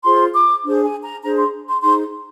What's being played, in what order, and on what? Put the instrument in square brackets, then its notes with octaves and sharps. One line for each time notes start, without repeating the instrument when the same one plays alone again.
[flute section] F4 G#4 C5 C6
D6
D4 G#4 C5
G#5
A#5
D4 G#4 C5 A#5
C6
C6
D#4 G#4 C5 C6